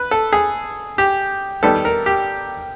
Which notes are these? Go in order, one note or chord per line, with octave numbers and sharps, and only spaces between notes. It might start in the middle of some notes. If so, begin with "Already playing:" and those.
Already playing: B4
A4
G#4
G4
D#3 G3 B3 A4
A#4
G4